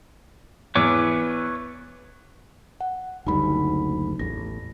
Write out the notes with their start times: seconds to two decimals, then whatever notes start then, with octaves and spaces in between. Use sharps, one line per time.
0.75 E2 B4 C#5 D6
2.81 F#5
3.26 F#1 D2 G3 D#4 B5
4.19 A1 E2 A#6